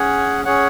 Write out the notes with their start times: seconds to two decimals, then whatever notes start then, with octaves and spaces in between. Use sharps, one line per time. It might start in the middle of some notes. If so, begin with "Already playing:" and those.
Already playing: C#4 G#4 C#5 F#5
0.45 C#4 G#4 C#5 F#5